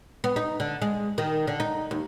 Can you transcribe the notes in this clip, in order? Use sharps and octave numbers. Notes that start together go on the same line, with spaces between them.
B3
D#4
D3
G#3
D#3
D3
D#4
D#2